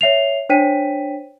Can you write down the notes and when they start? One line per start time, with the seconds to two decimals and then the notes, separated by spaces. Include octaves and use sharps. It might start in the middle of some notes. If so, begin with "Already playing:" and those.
0.01 C#5 E5 C7 F7
0.49 D4 C5 C#5 G5 B6 D#7